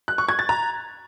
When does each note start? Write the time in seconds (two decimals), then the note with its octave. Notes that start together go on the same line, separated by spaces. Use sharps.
0.08 F#6
0.18 C#6
0.29 G#6
0.39 A6
0.49 A#5